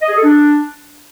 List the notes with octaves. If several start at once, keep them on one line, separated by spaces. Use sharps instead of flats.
D#5
G#4
A4
D4